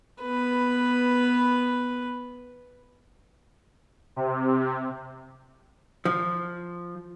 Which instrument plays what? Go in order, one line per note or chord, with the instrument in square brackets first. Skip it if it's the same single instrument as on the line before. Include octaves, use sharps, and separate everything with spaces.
[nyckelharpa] B3 B4
[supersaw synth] C3
[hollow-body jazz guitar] F3